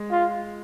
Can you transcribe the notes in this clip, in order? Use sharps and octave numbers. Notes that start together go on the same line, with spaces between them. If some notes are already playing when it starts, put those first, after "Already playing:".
Already playing: G#3
F4